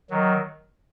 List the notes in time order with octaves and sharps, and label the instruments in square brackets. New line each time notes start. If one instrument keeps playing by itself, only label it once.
[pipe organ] D#3 F#3